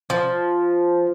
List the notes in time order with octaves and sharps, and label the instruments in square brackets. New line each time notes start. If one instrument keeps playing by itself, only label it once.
[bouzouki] F3